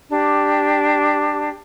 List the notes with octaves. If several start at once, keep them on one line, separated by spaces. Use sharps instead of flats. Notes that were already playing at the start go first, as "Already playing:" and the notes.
D4 G4